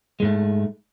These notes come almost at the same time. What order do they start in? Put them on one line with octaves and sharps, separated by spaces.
G#3 G#2 A3